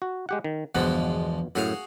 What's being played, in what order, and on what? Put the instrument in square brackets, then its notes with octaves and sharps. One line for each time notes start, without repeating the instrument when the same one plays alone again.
[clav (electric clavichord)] F#4
G#3 G4 F#5
D#3
[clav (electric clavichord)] G1 B2 F#5 [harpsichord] E2 F3 G#3
[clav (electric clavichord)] F#2 A2 [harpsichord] F#4 G#4 F5